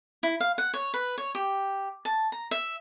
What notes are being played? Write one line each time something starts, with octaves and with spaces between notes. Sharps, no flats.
E4
F5
F#5
C#5
B4
C#5
G4
A5
A#5
E5